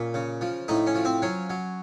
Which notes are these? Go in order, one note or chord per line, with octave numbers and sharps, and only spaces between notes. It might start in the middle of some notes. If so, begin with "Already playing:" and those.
Already playing: A#2 C#4
C#3
F3
A2 D#4
C#4
F3
C4
F#3 C#4
F#3